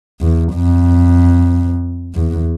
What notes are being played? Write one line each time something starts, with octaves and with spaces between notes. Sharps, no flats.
E2
F2
E2